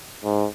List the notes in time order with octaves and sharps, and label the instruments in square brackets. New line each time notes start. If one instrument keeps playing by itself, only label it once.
[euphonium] G#2